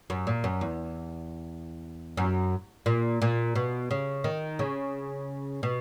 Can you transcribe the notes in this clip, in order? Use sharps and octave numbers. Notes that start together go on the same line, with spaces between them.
F#2
A#2
F#2
E2
F#2
A#2
A#2
B2
C#3
D#3
C#3
B2